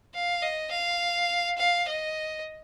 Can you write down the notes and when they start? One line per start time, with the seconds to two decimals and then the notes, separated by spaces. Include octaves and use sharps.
0.14 F5
0.43 D#5
0.71 F5
1.58 F5
1.88 D#5